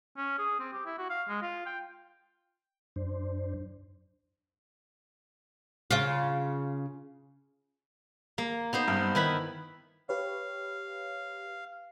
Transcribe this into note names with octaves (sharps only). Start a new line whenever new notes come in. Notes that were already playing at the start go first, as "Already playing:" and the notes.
C#4
G#4
C4
G4
E4
F#4
F5
G#3
F4
G5
F#2 D4 C5
C#3 F4
A#3
B3 D#4 C5
G2
D#3 E4 B4 B5
G4 B4 C#5 F5